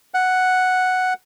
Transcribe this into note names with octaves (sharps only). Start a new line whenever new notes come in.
F#5